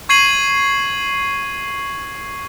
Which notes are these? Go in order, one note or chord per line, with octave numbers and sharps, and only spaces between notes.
C#6 G#6 C7 D#7 F#7